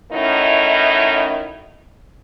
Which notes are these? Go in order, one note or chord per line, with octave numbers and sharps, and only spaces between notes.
D#3 F#3 A3 C#4 D#4 E4